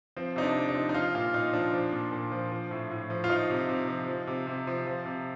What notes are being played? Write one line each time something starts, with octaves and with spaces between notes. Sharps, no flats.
F3 C4
C3 D#4
D4
C3
D#4
F3
D#4
F3 F4
A#2 F4
A#2 D#4
F3 D4
F3
A#2
A#2
F3
F3
A2
A2
F3
F4
F3 D#4
C3
C3
F3
F3
C3
C3
F3
F3
C3